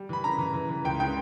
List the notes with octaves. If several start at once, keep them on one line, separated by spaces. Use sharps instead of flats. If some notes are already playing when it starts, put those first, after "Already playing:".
Already playing: G3
E3 B5
C#3 A#5
E3
E3
E3
C#2 G5
C#3 G5